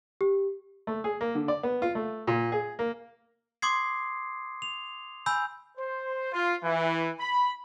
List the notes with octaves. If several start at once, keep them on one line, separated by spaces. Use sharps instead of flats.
G4
A3
G#4
A#3
D3
D5
B3
F4
A3
A#2
G#4
A#3
C6 D6 D#6 G#6 C7
F7
G#5 B5 E6 G6
C5
F4
E3
B5